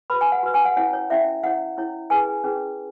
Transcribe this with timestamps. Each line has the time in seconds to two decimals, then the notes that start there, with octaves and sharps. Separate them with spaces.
0.10 F#4 B4 B5
0.21 G#5
0.32 F#5
0.43 F#4 B4
0.54 G#5
0.65 F#5
0.76 C#4 E4 C#5 F#5
0.93 C#5
1.10 C#4 E4 C#5 E5
1.43 C#4 E4 C#5 F#5
1.77 C#4 E4 C#5
2.10 C#4 E4 G#4 B4 G#5
2.44 C#4 E4 G#4 B4